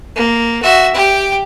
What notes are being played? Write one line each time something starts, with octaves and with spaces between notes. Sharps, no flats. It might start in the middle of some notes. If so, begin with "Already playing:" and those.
A#3
F#4 E5
G4 G5